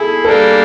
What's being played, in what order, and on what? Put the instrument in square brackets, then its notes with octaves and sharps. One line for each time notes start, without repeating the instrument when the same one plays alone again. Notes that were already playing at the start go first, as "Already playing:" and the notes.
Already playing: [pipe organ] E4 [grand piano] G#4 A4
[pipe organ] G3 A#3 D4 [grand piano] A4